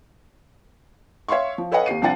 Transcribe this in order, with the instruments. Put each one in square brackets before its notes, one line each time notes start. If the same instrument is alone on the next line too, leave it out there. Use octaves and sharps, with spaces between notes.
[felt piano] C#5 E5 F5 C6 C#6
F3
A4 B4 C#5 D#5 F5 F#5
D#2 G4 C7 D#7
C2 F3 D4 F#5 A6